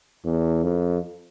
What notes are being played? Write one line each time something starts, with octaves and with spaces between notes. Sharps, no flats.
E2
F2